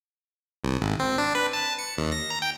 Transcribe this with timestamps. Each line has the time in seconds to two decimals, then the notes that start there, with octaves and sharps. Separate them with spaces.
0.64 C2
0.81 G#1
1.00 C4
1.18 D4
1.35 B4
1.53 A5
1.79 C#7
1.97 D#2
2.12 A#6
2.30 A#5
2.42 G5